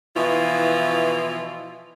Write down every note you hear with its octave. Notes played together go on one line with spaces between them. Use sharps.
B2 E3 F3 E4 F4